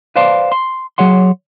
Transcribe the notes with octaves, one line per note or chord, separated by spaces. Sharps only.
B4 C5 D5 F5 A5 C6
C6
F#3 G#4 C#5 F#5 C6